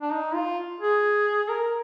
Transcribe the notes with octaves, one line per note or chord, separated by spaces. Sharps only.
D4
D#4
F4
G#4
A#4